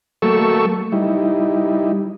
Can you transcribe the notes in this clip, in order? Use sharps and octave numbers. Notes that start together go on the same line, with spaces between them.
F#3 A3 A#3 A4 C#6 E6
G3 D#4 E4